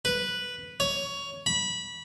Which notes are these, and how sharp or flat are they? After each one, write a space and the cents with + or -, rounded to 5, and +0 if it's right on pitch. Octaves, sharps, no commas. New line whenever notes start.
B4 -5
C#5 +15
B5 -20